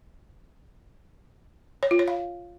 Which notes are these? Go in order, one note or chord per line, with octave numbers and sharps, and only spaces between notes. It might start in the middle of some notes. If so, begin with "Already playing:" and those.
C#5
F4
C#5
F5